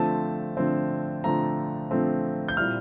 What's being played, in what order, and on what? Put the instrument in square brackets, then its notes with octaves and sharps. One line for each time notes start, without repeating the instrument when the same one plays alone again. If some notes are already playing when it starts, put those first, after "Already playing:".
Already playing: [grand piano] D3 F3 A3 C4 A5
D3 F3 A3 C4
D3 F3 A3 C4 A#5
D3 F3 A3 C4
G6
A#2 G3 C4 E4 F6